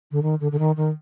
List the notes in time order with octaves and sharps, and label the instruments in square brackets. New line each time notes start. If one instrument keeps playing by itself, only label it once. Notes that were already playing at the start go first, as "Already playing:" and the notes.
[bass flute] D3
D#3
D3
D3
D#3
D#3